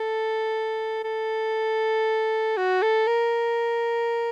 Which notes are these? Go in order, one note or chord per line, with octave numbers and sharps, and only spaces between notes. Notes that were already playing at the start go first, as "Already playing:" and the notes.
Already playing: A4
A4
F#4
A4
A#4